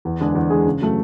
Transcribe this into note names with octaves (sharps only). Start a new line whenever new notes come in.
E2
D3 G#3 D4 G#4
E2
D3 G#3 D4 G#4
C#3
F#3 A3